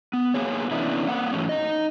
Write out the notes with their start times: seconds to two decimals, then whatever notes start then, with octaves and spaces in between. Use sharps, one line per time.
0.13 B3
0.34 A#3 B3 G#4 C#5
0.71 C3 E3 B3 C#4 D4 E4
1.08 A#3 C4 F#5
1.32 G#2 E3 F#3 A3 C#4
1.49 D#4 D#5